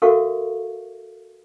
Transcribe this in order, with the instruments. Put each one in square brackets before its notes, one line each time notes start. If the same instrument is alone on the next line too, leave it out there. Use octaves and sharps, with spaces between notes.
[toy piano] F#4 A4 A#4 E5 F5 C#6